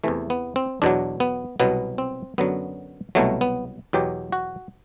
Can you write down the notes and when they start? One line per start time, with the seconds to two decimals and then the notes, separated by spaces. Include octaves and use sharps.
0.04 E2 C3 E3 A3
0.30 B3
0.56 C4
0.82 E2 B2 F#3 D4
1.20 B3
1.60 C2 B2 F#3 B3
1.98 C4
2.38 F#2 D3 F#3 B3
3.15 C2 B2 F#3 A3
3.41 B3
3.93 E2 B2 F#3 G4
4.32 F#4